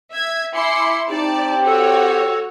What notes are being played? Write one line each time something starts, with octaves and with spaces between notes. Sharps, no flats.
E5 G#6
E4 G#5 B5 C6 D6 C#7
C4 D#4 G4 D5 A5
F#4 A4 C#5